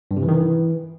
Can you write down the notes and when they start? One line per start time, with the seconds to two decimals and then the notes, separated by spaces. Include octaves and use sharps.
0.11 G2
0.17 C3
0.22 E3
0.28 D#3
0.34 E3